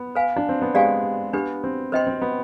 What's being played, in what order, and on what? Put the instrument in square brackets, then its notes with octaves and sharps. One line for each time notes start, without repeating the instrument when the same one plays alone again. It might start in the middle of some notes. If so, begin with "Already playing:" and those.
Already playing: [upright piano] B3
[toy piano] B4 F5 G#5
[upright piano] D4
C4
B3
[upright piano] G#3 [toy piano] G4 D5 F5 G#5
[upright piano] B3 [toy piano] D4 G4 B4
[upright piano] C4
[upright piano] C4 [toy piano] B4 D#5 G5 C6
[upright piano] C4
B3